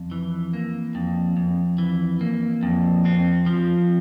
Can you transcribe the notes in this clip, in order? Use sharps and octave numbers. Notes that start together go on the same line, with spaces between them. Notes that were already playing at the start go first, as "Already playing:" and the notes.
Already playing: F2
E3
A#3
F2
F2
E3
A#3
F2
C4
F3